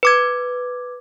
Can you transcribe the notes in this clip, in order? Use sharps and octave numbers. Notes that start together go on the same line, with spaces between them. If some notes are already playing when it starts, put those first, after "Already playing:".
B4 D6 G#6